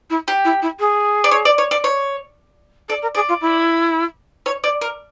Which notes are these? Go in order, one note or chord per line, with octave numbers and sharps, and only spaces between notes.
E4
G4
E4
E4
G#4
D5
C#5
D5
C#5
D5
C#5
A4 D5
A#4
G#4 D5
F4
E4
C#5
D5
A#4